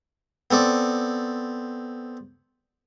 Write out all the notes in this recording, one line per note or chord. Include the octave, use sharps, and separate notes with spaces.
B3 C4 A4 D5